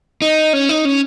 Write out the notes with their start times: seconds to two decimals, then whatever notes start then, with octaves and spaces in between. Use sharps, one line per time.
0.22 D#4
0.53 C#4
0.69 D#4
0.85 C#4